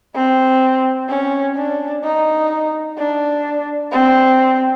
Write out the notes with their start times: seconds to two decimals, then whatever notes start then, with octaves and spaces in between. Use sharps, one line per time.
0.15 C4
1.09 C#4
1.56 D4
2.04 D#4
2.98 D4
3.92 C4